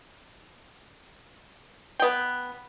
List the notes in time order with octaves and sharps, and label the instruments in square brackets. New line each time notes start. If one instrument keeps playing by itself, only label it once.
[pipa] B3 G5